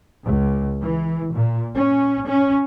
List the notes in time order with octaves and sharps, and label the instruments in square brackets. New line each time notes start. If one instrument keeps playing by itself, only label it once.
[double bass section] C#2
E3
A#2
C#4
C#4